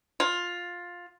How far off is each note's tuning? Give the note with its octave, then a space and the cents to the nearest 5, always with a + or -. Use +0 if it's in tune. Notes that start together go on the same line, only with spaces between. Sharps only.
F4 +10